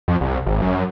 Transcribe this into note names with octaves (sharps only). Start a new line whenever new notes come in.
F2
C2
G#1
F#2